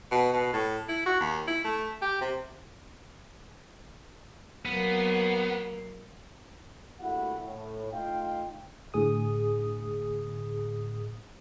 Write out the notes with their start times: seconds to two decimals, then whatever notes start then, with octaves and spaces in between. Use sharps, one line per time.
0.11 B2
0.33 B2
0.53 A2
0.88 E4
1.06 F#4
1.20 D#2
1.47 E4
1.64 A3
2.01 G4
2.21 C3
4.65 F#3 A#3 B3
7.00 A#1 A3 E4 F#4 G4 F#5
7.42 A2
7.92 A3 D#4 F4 F5 G5
8.94 A2 D3 G#4 D#6